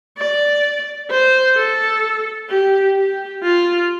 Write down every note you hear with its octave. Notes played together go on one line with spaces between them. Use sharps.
D5
C5
A4
G4
G4
F4